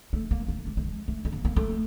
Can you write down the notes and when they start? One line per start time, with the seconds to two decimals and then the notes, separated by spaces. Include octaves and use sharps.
0.13 A3
0.31 A#3
0.48 A3
0.67 A3
0.77 A3
0.84 G#3
1.08 A3
1.25 A3
1.32 A#3
1.45 A#3
1.56 A3